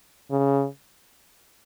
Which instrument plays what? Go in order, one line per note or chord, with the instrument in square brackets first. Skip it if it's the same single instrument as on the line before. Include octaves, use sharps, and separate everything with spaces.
[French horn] C#3